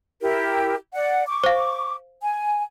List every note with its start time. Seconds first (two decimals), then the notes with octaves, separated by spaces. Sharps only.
0.21 E4 G4 A#4
0.94 D5 F#5
1.27 C#6 D6
1.44 C5 F5
2.21 G#5